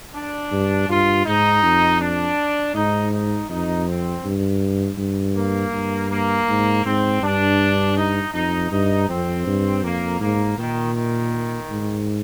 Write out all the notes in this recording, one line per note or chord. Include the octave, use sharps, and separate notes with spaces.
D4
G2
G2 F4
G#2 D#4
F2
D4
G#2 D#4
D#4
F2 D#4
C4
G2
G2
A#3
G2
A#3
G#2
G#2 C4
G2 D4
D#4
F2 D#4
G2 D#4
F2 C4
G2
F2 A#3
G#2 A#3
A#2 D#3
D#3
G#2